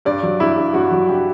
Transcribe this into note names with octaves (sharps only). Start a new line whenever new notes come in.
G2 D5
F#3
G2 E4
G2
G2 F#4
F#3
G2 G4